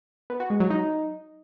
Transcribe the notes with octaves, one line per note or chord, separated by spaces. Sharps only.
B3
F#4
G#3
F#3
D#4